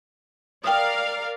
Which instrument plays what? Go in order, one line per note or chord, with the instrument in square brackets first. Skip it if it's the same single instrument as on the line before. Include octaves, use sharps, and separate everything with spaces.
[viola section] A#4 D5 F5 [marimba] G5 D#6